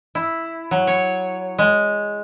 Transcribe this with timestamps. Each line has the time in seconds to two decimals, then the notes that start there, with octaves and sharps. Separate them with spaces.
0.15 E4
0.71 F#3
0.87 C#5
1.58 G#3